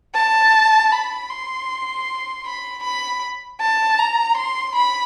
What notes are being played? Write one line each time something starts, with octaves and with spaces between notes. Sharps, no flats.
A5
B5
C6
B5
B5
A5
A#5
C6
B5